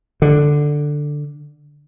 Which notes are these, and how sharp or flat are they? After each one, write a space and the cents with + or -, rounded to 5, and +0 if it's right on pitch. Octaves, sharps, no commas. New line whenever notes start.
D3 +5